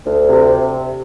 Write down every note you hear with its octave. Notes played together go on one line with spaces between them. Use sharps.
D2
C3